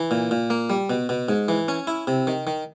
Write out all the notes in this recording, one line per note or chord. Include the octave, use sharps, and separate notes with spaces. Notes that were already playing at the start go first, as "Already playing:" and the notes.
Already playing: E3
A#2
A#2
A#3
G3
B2
B2
G#2
E3
C#4
E4
C3
D#3
D#3